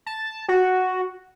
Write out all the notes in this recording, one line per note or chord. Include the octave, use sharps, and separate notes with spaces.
A5
F#4